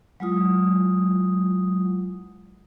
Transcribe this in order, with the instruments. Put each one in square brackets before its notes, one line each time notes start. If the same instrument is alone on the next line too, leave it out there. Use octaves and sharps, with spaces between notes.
[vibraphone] F#3 G#3 E4 F4 D#6